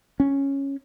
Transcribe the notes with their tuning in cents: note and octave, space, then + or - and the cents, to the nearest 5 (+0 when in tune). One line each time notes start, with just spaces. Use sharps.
C#4 -5